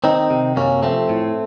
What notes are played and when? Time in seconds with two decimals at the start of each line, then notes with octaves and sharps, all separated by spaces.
0.04 D#3 C4 D#4
0.30 C3
0.56 F#2 A#3 C#4
0.82 F3 A3 C4
1.09 A2